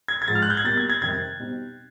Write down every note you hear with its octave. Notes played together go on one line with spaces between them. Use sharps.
G#6
G#6
G#2 F3 G#3 A6
F6
F#6
G6
G#6
B2 G3 A#3 A6
G#6
G#6
F2 C3 D#3 G3 C4 G#6
B2 G3 C4 D#4